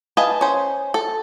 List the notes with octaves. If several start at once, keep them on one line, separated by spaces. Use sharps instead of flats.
B4 D#5 F5 G#5 A5
C#4 C5
A4